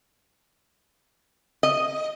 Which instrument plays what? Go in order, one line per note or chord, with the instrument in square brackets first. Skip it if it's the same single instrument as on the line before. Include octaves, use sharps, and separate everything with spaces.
[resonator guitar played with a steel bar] D#5